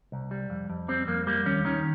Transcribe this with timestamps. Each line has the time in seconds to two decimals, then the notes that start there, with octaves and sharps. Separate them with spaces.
0.12 C2
0.31 G3
0.50 F2
0.70 F2
0.88 G3 C4
1.08 F2 A#3
1.27 G3 A#3
1.46 D#2 C#4
1.65 D#3 C#4